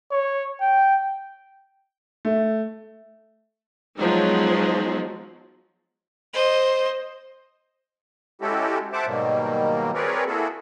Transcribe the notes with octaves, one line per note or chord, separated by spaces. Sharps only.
C#5
G5
A3
F3 F#3 G#3 B3 D#4
C5 D#5
G#3 C#4 E4 F#4 G4 A4
C5 E5 F#5 A5 D6
G#2 B2 D#3 F#3 G3 A#3
C4 G#4 A#4 B4 C#5 D5
A#3 E4 F#4 G#4 A4